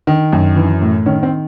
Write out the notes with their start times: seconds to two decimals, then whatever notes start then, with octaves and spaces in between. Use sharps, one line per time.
0.07 D#3
0.33 F#2
0.56 E3
0.82 A2
1.06 D#3 C#4
1.23 C4